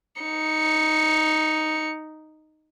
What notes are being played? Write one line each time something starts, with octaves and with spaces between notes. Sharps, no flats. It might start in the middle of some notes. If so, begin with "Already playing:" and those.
D#4 C#7